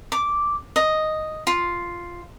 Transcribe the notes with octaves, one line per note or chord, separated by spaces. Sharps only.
D6
D#5
F4